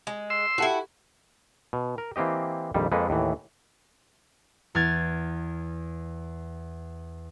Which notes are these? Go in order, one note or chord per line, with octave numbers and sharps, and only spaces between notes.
G#3
C6 E6
E4 F#4 G4 A4 F#5
B2
A#4
E3 A#3 C4 G4 D#5
A#1 F2 D#3 G3
F2 G#3 A#3 A4 B4
D#2 A2 E3
E2 F6 G#6 A6